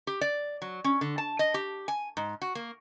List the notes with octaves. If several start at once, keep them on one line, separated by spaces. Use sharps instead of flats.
G4
D5
F#3
C#4
D3
A5
D#5
G4
G#5
G#2
F#4
A#3